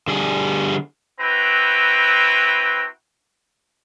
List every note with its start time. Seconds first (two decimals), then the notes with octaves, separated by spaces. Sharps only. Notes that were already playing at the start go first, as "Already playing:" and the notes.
0.08 D3 G3 G#4
1.20 C4 E4 F#4 B4 G5 A#5